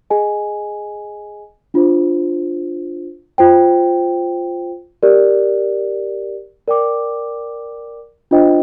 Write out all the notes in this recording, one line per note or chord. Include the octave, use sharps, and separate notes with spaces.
G#4 D#5 G#5
D4 F4 C5
F4 C5 G5
G4 A#4 D5
A#4 D5 G5 D6
D4 F4 C5 D#5 G5